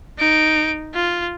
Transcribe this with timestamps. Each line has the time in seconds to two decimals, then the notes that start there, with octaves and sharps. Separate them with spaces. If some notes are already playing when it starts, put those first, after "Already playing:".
0.18 D#4 D7
0.94 F4